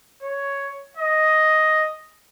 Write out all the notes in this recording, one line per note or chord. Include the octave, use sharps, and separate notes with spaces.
C#5
D#5